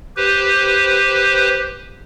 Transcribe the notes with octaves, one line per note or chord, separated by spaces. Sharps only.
G4 B4 C5